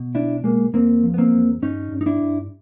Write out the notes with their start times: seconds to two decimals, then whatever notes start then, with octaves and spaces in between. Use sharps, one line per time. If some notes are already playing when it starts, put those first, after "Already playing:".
Already playing: B2
0.14 B1 D4 E4
0.44 B1 G#3 A#3
0.73 E2 A#3 C4
1.03 F3
1.14 B3
1.18 A#3 C4
1.33 E2
1.62 G2 C#4 D#4
1.92 G2
2.01 D#4
2.06 D4 E4
2.22 G2